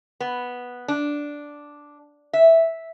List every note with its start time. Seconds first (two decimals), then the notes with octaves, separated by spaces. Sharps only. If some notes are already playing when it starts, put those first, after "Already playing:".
0.20 B3
0.88 D4
2.33 E5